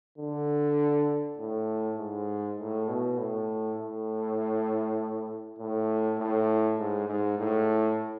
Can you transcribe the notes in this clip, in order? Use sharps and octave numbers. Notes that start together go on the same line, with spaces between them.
D3
A2
G#2
A2
B2
A2
A2
A2
A2
G#2
G#2
A2